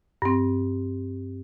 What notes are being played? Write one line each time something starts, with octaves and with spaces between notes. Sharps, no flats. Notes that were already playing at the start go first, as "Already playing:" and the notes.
G2 C4